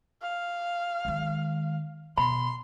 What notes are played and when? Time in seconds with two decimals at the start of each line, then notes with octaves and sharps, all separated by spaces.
0.22 F5
1.05 D#3 G#3
2.18 B2 B5 C6